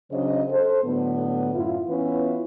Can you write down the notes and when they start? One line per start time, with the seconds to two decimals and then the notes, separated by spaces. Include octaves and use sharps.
0.12 C#3 F#3 D4 C5 D#5
0.50 A4 C5
0.83 A2 D3 F#3 B3
1.53 F#2 A2 E4 F4
1.87 E3 B3 C#4 E4 F4 B4